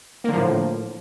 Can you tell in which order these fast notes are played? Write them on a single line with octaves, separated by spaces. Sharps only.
A#3 D3 F3 A2